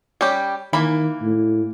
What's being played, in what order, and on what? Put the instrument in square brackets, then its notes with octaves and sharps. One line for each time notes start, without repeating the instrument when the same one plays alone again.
[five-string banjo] G3 C#4 G4
[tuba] D#3 [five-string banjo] E3 A#3 B5
[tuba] A2